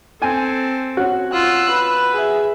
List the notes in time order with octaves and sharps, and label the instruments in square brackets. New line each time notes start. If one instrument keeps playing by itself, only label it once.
[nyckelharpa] C4 A4 [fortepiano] G5 G#5
[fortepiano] C#4 F#4
[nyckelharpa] F4 [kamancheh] E6 F#6
[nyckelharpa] B4
[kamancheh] G#4 E5